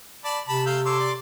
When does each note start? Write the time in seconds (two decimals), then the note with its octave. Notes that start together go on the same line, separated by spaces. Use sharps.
0.25 D5 A5 B5
0.48 C3 A5 B5
0.66 A3 F5 E6 G6
0.86 A4 C#5 C6 D6 E6
1.00 D5